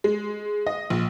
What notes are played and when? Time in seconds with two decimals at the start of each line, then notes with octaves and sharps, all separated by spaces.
0.04 G#3
0.66 D#5
0.90 A#1